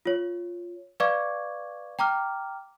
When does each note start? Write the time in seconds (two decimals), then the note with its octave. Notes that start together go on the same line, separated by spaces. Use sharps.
0.06 F4 C#5
1.00 B4 D5 F5 C#6 D6 G#6
1.99 G5 A#5 D6 F6